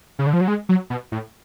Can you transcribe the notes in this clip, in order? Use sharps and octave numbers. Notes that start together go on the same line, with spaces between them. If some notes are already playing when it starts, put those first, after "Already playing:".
C#3
D3
F3
F#3
G#3
F#3
B2
A2